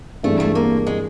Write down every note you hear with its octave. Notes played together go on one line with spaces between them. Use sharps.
G2 E3 G#3 A3 C4
A3
A#3
G#3